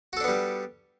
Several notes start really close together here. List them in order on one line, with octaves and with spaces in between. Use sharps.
F#4 A4 D4 B3 G3